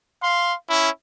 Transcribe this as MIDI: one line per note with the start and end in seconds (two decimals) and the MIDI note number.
0.22 0.53 77
0.22 0.53 84
0.69 0.89 61
0.69 0.89 64